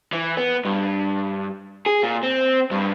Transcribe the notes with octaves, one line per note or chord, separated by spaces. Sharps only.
E3
B3
G2
G#4
A#2
C4
G2